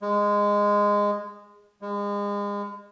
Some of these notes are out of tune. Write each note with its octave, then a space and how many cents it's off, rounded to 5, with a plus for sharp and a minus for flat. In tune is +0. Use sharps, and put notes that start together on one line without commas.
G#3 -15
G#3 -35